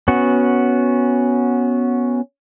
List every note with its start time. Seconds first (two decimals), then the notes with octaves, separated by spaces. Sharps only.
0.08 B3 C#4 F#4